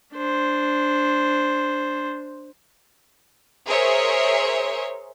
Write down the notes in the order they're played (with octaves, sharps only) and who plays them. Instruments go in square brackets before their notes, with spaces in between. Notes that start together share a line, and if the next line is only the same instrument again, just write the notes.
[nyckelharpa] D4 C5
[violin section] G#4 A#4 C5 C#5 E5